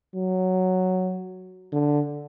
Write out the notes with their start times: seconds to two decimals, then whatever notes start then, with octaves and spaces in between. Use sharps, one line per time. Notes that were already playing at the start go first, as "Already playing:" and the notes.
0.15 F#3
1.72 D3